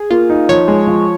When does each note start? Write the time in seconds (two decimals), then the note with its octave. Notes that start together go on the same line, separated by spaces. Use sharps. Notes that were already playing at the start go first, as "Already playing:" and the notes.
Already playing: G#4
0.10 A#3 F4
0.30 D#4
0.49 F3 C#5
0.68 G#3
0.87 F3